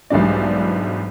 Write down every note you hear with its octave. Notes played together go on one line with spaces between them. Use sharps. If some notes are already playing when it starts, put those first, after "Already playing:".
B1 G#2 E3 G3 D4 D5